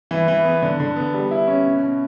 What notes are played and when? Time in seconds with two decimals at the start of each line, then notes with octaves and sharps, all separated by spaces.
0.11 E3
0.28 E3
0.45 B3
0.62 D3
0.80 D3
0.96 B3
1.14 G3
1.31 E4
1.48 C#4
1.66 B2
1.83 B2